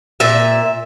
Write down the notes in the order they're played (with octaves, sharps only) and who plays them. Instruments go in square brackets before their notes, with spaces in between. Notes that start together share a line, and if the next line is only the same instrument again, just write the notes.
[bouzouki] A#2 E5